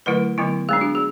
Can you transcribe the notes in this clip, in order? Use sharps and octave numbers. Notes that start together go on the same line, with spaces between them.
D3 F#3 A3 E4 B4
D3 F#3 B3 E4
G#3 B3 D4 G#4
F#4
G#4